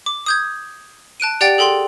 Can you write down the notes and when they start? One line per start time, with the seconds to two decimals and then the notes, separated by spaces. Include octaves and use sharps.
0.06 D6
0.26 D#6 G6 G#6
1.20 A5 F#6 D7 D#7
1.41 G4 D5 F#5 G5 A6 D7
1.58 G#4 A4 G5 C6 F#7